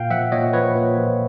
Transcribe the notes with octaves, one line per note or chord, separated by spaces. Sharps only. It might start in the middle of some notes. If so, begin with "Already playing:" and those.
Already playing: A#2 F5 G5
F3 E5 F#5
A#2 C#5 D#5
F3 B4 C#5
A#2
F3